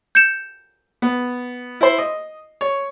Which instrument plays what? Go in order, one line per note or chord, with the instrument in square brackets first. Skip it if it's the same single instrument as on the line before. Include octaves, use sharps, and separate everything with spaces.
[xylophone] G6 C#7 E7
[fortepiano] B3
E4 C5
D#5
C#5